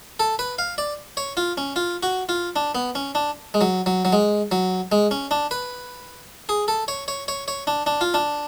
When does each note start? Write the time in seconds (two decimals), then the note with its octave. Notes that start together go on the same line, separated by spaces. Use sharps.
0.20 A4
0.39 B4
0.59 F5
0.78 D5
1.17 C#5
1.37 F4
1.57 C#4
1.76 F4
2.03 F#4
2.29 F4
2.56 D4
2.75 B3
2.95 C#4
3.15 D4
3.54 G#3
3.61 F#3
3.86 F#3
4.05 F#3
4.12 G#3
4.51 F#3
4.92 G#3
5.11 C#4
5.31 D4
5.51 B4
6.49 G#4
6.68 A4
6.88 C#5
7.08 C#5
7.28 C#5
7.48 C#5
7.67 D4
7.86 D4
8.01 F4
8.14 D4